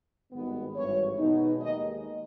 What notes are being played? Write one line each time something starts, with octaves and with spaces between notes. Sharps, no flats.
G#1 G2 D#3 G#3 B3
G#1 G2 E3 C#5
B1 B2 G#3 B3 D#4
D#2 D#3 G#3 D#4 D#5